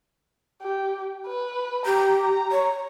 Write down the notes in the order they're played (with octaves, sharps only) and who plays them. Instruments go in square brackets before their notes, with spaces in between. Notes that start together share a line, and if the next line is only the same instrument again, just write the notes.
[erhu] G4
B4
[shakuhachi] G4 [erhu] A#5
[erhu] A#5
[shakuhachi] C#5